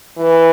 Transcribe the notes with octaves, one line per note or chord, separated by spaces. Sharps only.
E3